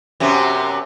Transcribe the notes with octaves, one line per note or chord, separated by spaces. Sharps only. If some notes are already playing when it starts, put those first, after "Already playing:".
F#2 C3 B3